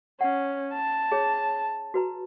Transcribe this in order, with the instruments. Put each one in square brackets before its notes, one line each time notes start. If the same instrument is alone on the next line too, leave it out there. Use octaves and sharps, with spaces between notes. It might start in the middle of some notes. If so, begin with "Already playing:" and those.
[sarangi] C#4 [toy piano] F#5
[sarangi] A5
[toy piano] G#4 C#5
F#4 B4 A#5